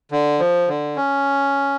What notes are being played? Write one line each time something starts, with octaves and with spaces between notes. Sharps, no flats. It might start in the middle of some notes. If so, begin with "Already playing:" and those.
D3
F3
D3
C#4